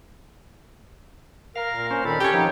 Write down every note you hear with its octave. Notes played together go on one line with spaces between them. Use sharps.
A#4 F5
A#2
C#4 C5
F2 D#3 A4 B5
C#4 G4 C#5
F3 A3 C4 D#4 F#5